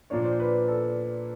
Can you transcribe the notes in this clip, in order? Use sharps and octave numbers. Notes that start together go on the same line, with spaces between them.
A#2 F3 A#3 D4 C#5
C5
B4
A4